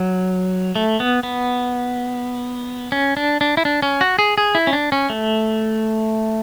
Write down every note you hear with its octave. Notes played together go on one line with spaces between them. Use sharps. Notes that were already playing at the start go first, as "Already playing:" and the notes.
Already playing: F#3
A3
B3
B3
C#4
D4
D4
E4
D4
C#4
F#4
G#4
G#4
E4
C#4
D4
C#4
A3